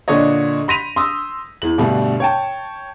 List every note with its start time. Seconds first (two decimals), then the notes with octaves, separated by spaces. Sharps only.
0.08 A#2 D3 D4 C#5 D#5
0.68 B5 C6 A#6 B6 D#7 F7
0.96 C6 D#6 E6
1.62 E2 E3 F#7
1.78 G2 B2 D3 G3 A3
2.20 C#5 G5 A5